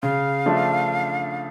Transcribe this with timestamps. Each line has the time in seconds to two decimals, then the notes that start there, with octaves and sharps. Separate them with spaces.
0.03 C#3 F5
0.46 F3 A3 D4